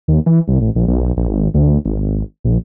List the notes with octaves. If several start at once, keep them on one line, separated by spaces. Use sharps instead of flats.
D#2
E3
C2
A1
A#1
B1
A#1
G#1
D2
G#1
A#1